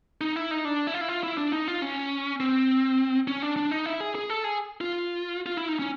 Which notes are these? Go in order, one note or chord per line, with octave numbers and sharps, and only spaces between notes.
D#4
E4
D#4
D4
E4
F4
E4
F4
E4
D4
D#4
F4
C#4
C4
C#4
D4
D4
D#4
E4
G#4
G#4
A4
G#4
F4
F4
E4
D#4
C#4